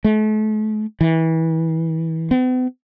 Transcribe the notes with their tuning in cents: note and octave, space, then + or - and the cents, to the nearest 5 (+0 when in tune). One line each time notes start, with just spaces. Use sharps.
A3 -40
E3 -25
B3 +45